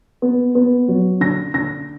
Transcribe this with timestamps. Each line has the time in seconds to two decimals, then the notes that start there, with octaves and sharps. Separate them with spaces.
0.22 B3
0.55 B3
0.88 F#3
1.21 D3 A#6
1.54 D3 A#6